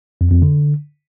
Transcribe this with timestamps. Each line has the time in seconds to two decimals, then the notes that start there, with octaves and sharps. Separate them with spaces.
0.21 F2
0.32 F2
0.42 D3